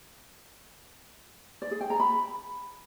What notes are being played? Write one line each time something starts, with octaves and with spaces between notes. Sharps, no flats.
D5
G#4
G5
A#5
B5